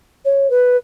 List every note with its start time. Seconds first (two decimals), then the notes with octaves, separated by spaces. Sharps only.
0.25 C#5
0.50 B4